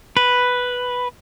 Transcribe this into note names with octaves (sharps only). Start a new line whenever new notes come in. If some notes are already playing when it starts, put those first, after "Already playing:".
B4